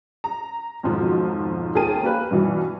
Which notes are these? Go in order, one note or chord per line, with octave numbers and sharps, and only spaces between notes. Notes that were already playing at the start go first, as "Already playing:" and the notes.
A#5
F2 G#2 B2 D#3 F3 F#3
D#2 G#4 A#4 G5 A5 D#7
A#3 G4 B4
G2 B2 E3